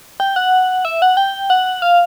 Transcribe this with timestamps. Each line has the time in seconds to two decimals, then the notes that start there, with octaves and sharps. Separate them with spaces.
0.20 G5
0.36 F#5
0.85 E5
1.02 F#5
1.17 G5
1.50 F#5
1.82 F5